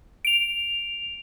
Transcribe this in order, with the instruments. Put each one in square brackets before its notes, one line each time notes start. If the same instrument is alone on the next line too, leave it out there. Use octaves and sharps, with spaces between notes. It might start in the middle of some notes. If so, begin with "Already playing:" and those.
[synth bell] D7 F7